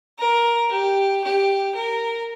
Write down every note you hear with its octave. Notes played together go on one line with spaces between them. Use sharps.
A#4
G4
G4
A#4